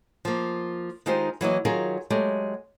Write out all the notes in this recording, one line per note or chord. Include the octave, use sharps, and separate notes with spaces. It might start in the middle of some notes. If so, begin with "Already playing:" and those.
F3 A#3
D#3 G#3 D#4 F4 G4 C5
E3 F#3 A#3 D#5
D#3 F#3 F4 G#4 A#4
F#3 G#3 A3 G4